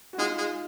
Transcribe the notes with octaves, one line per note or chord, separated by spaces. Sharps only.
F#4
G#3 D#4 F4
G#3